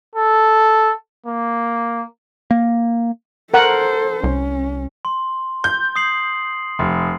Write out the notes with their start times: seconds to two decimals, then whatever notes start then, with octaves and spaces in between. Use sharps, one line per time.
0.15 A4
1.26 A#3
2.51 A#3
3.54 A4 A#4 C5 F#5
4.24 C2 C#4
5.05 C6
5.64 G6
5.96 D#6 C7 F#7
6.79 F1